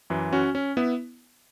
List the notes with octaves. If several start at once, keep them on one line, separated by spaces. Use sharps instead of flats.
F#2 E3
C#4 F#4
C#4
B3 E4